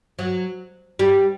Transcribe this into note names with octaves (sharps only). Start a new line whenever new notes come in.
F#3
G3